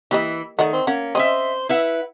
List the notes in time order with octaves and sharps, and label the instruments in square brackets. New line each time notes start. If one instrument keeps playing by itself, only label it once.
[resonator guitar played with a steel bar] E3 E4 [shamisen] A#3 G4 D#5
[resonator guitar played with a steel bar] D#3 [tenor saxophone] A3 [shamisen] D5 D#5 F#5
[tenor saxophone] C4
[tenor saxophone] A#3 [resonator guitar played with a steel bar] C#4 [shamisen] F#5
[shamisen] C4 C#4 [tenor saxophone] C5 [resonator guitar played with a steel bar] D#5 E5
[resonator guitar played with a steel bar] E4 E5 F#5 [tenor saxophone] B4